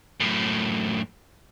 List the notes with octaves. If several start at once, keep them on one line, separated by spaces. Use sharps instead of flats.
F#2 A2